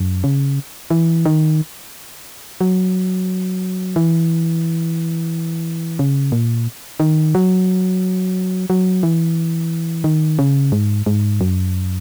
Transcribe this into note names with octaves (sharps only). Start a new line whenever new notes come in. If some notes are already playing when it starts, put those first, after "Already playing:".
Already playing: F#2
C#3
E3
D#3
F#3
E3
C#3
A#2
D#3
F#3
F#3
E3
D#3
C#3
G#2
G#2
F#2